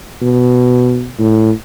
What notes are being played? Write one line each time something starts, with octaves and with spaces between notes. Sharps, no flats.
B2
A2